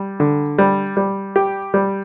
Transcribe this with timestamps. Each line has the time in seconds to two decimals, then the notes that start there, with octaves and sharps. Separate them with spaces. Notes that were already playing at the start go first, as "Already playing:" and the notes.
Already playing: G3
0.20 D3
0.58 G3
0.97 G3
1.36 G4
1.74 G3